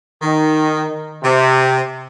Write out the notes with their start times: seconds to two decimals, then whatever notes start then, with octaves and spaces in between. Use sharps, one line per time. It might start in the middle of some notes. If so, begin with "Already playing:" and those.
0.22 D#3
1.23 C3